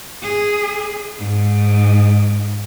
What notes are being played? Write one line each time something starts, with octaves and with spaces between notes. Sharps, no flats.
G#4
G#2